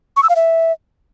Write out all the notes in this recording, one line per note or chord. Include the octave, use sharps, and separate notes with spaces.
C#6
E6
F5
E5